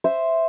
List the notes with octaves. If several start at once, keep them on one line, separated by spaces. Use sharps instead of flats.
C5 E5